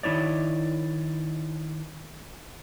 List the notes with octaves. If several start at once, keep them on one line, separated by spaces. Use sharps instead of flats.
D#3 G#3 E4 C#5 D5